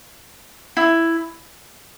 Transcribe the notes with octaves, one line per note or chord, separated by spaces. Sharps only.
E4